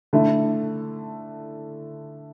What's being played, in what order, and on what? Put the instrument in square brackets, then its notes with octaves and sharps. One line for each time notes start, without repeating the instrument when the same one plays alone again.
[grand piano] D3 A3 E4